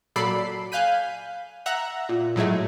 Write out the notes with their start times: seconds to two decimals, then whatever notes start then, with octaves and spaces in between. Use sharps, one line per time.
0.16 A#2 F#3 A4 D5 B5 C7
0.72 F5 G#5 F#6 G6 B6 D#7
1.66 E5 F#5 A#5 F#6
2.09 A#2
2.36 A2 F#3 G#3 A3